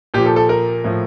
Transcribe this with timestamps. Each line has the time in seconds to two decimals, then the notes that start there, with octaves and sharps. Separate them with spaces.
0.14 A#2 F3 G4
0.26 A4
0.36 A4
0.49 A#4
0.84 A2 F3